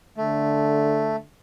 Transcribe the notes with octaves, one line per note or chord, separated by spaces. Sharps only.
D3 A3